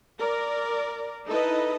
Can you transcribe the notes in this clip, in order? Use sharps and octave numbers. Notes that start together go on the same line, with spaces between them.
A#4 D5
D#4 E4 A4 B4 D#5